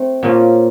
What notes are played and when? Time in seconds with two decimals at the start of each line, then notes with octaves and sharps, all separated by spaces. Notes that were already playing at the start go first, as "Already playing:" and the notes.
Already playing: A3 C4
0.23 A#2 F3 A#3 C#4